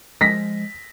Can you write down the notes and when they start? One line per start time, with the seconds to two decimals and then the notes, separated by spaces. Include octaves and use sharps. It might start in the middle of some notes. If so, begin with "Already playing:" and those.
0.21 F3 G#3 A#6 B6